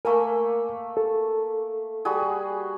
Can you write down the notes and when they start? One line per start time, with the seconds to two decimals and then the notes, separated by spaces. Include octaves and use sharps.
0.05 A3 A#3 A#4 G#5
0.97 A4
2.05 G3 F#4 G#4